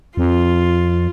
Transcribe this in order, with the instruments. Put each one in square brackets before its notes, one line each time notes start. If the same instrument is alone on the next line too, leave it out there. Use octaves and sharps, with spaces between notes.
[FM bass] F2 [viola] F4